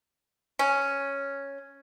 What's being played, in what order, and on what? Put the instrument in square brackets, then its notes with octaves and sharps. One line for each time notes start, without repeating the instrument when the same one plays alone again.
[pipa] C#4